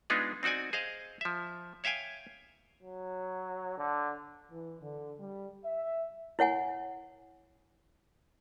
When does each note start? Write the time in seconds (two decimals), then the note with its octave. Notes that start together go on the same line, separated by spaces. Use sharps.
0.10 G#3 B3 D4 D#4 F4 G#4
0.43 C4 D#4 F#4 D5 G#5
0.73 G#4 C5 D#5 F5
1.21 F3 E5
1.84 C#5 E5 F5 G5 G#5
2.83 F#3
3.78 D3
4.51 E3
4.81 D3
5.19 G3
5.65 E5
6.39 E4 C#5 F#5 G#5